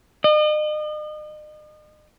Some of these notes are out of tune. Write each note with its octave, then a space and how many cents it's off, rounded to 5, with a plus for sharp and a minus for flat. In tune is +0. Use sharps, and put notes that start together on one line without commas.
D#5 -40